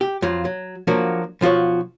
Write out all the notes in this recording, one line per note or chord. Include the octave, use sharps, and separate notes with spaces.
G4
F2 F#3 F4
F#3
F3 F#3 A#3 D4 F#4
B1 F3 F4 F#4 C#5